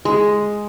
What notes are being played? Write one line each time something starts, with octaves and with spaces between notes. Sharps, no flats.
G#3